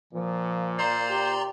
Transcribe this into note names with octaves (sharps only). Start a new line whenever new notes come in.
A#2 F3
C5 D5 A#5 C6
G4